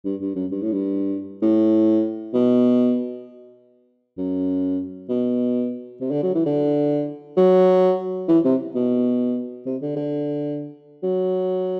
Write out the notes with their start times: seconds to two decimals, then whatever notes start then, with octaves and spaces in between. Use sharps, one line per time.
0.05 G2
0.20 G2
0.35 F#2
0.51 G2
0.62 A2
0.73 G2
1.42 A2
2.34 B2
4.17 F#2
5.09 B2
6.00 C3
6.11 D3
6.23 F#3
6.35 E3
6.46 D3
7.37 F#3
8.28 E3
8.44 C3
8.75 B2
9.66 C3
9.82 D3
9.96 D3
11.03 F#3